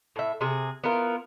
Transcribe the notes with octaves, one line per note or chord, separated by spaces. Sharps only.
A2 E5
C3 G#4
B3 E4 F4 A#4